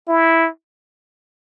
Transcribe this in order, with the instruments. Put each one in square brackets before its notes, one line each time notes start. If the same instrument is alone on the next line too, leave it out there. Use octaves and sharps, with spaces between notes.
[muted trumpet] E4